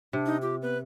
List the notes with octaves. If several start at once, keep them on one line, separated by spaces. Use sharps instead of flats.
C3 D4
D#4
F4 G4
B3 B4